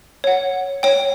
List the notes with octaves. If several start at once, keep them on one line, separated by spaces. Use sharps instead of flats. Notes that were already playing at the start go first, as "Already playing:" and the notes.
C#5 F#5
C#5 G5